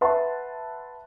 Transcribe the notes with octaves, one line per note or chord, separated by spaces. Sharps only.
B4 E5 F#5 A5 C6